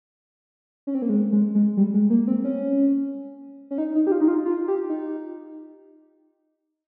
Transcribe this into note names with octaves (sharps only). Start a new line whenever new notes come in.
C#4
C4
A#3
G#3
G#3
G#3
G3
G#3
A#3
C4
C#4
C#4
D#4
D#4
G4
F4
D#4
F4
F4
G4
D#4